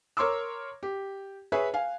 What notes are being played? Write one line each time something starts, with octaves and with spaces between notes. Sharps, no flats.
A#4 C#5 C6 D6 E6
G4
G#4 B4 C#5 E5
F5 G#5